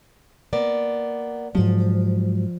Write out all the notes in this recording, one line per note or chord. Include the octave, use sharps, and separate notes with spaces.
A#3 B3 D5
G#2 F3 F#3